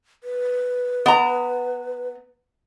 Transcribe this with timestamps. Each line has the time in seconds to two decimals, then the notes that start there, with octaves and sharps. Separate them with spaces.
0.24 B4
1.06 B3 A#5